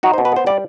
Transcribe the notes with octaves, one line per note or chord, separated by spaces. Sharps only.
D#4 F#4
C5
B2
B4
B3 C5
G3 D5